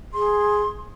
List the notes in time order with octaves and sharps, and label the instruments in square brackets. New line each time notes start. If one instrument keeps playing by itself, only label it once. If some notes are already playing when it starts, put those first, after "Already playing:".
[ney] G#4 [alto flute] C6